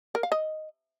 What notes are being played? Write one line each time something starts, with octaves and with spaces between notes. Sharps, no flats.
A#4
F5
D#5